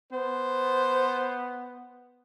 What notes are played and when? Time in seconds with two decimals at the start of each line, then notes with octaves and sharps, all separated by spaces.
0.12 B3 C5